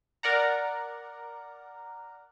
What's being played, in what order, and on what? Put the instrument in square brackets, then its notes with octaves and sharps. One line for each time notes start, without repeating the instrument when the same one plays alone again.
[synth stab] A#4 D5 F#5 A#5